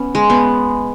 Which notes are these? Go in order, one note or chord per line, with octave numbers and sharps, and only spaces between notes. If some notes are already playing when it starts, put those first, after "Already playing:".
Already playing: B3 C#4
G#3
B3